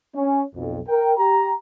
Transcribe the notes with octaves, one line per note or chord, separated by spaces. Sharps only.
C#4
B1 F2
A#4 G5
G4 A#5